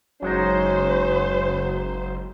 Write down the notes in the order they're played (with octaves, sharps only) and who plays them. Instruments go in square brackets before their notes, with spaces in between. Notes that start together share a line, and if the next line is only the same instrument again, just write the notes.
[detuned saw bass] F#1 [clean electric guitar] F#3 G#3 D#4 [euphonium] C#4 [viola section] C5